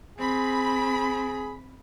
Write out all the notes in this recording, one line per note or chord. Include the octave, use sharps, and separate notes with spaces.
C4 G#4 B5